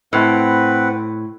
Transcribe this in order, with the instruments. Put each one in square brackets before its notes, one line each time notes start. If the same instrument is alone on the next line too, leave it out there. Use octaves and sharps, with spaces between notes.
[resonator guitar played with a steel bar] A2 [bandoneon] C4 B4 F#5